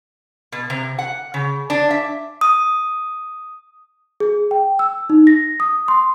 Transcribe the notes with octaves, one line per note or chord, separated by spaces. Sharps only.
B2
C3
F#5
C#3
D4
E5
D#6
G#4
G5
E6
D#4
A#6
D#6
C6